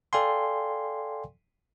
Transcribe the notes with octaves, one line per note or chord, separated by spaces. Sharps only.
A4 D5 F5 G5 G#5 C6